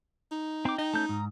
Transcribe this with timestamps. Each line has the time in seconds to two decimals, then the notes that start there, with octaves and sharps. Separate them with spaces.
0.31 D#4
0.65 C4 G5 D6
0.78 D#4 D#5
0.94 A3 C#4 A5 G6
1.09 G#2 A#5